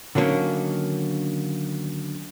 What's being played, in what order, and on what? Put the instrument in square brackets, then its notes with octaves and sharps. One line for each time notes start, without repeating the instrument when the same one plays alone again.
[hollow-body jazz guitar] D3 D#3 F#3 A#3 C#4